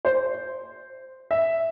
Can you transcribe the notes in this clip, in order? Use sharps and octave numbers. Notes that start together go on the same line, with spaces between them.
C5
E5